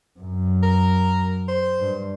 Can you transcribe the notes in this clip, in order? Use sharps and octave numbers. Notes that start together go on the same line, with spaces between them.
F#2
A#4
C5
G2